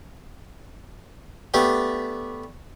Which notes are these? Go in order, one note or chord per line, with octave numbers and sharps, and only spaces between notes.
A3 B3 D4 G4